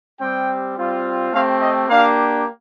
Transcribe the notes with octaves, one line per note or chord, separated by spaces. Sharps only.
G3 C4 G4 G5
G3 C4 F4
A3 C4 G4 F5
D#5
A#3 D4 G4 F5